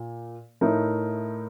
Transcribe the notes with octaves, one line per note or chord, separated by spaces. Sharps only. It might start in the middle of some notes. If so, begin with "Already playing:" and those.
Already playing: A#2
A2 A3 D#4 A#4